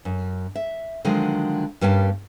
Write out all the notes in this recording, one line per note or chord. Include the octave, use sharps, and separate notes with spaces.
F#2
E5
D3 D#3 F3 F#3 G#3
G2 G3 A#3 C#4 G#5 A5